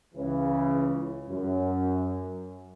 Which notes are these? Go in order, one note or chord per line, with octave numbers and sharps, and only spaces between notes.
C#2 C#3 E3
F#2